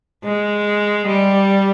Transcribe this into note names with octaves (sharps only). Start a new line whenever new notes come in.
G#3
G3